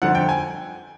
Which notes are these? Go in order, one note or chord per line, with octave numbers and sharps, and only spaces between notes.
G1 F2 D3 F3 F#5
G5
G#5